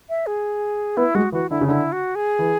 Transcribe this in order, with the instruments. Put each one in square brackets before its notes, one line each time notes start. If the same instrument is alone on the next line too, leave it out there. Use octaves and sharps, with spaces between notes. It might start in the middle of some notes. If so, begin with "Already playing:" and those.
[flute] E5
G#4
[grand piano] B3 [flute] E4
[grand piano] G#3 [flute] F#4
[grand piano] E3 [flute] F#4
[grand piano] D3 [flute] E4
[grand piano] C#3
[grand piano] D3 [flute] E4
[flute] F#4
G#4
[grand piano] E3